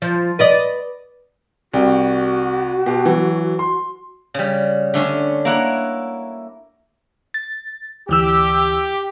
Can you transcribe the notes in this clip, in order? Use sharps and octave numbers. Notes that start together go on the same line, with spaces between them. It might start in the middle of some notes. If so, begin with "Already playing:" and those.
F3
B4 D5 D#5
C2 F#4 G5
B2 G4
E3 F#3
C6
C#3 G3
D3 A3 C#4
A#3 E4 C#5 F#5
A6
D2 E3 G4 E6